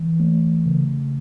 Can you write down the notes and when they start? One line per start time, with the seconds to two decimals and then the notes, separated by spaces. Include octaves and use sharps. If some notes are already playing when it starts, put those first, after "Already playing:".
Already playing: E3
0.20 A3
0.66 C#3